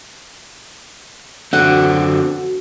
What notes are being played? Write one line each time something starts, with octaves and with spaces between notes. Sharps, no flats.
F#2 D3 C4 F#4 F#5